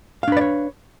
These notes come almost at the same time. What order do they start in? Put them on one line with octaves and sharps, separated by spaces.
F5 D4 B4 D5 C#5